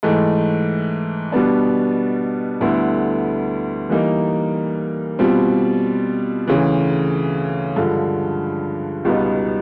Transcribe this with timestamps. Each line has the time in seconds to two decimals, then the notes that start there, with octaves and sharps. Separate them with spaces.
0.03 G#2 E3 A3
1.32 B2 G3 B3 D4
2.61 D2 D3 G3 B3 E4
3.89 E3 G3 A#3 D#4
5.19 B2 G3 C4 F4
6.47 D2 C#3 E3
7.76 G2 D3 F3 G#3
9.05 C#2 B2 G3 B3 D#4